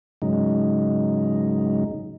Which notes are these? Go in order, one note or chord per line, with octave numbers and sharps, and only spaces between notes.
G#2 C#3 F#3 G#3 D#4